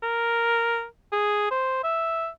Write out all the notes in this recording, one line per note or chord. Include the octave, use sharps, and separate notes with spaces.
A#4
G#4
C5
E5